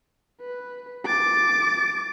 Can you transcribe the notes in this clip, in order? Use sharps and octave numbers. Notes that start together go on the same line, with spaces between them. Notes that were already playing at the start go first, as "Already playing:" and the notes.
B4
D6 A6